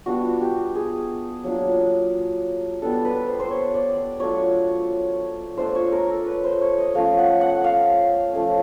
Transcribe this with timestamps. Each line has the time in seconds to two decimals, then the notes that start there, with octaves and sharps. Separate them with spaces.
0.06 G3 B3 D4 F4 F#4
0.41 G4
0.75 G#4
1.44 F#3 A#3 D4 F4
2.82 G3 B3 D4 A4
3.05 B4
3.28 C5
3.40 C5
3.50 C#5
3.74 D5
3.97 D5
4.20 F#3 A3 D4 F4 C#5
5.58 A3 D4 F4 C5
5.75 C#5
5.92 A#4
6.09 A4
6.26 B4
6.44 C5
6.61 C#5
6.78 D#5
6.95 F3 A3 C#4 F4 F5
7.18 F#5
7.41 F#5
7.64 F5
8.33 F3 A3 C#4